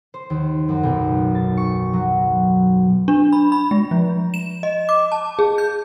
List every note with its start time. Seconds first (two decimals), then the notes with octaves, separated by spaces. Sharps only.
0.14 C5
0.30 D#2
0.68 F#2
0.83 B1
1.35 A6
1.57 C#6
1.93 F#3
3.08 D4
3.33 B5
3.52 B5
3.71 G#3
3.91 F3
4.34 E7
4.63 D#5
4.89 D6
5.12 A5
5.39 G#4
5.58 G6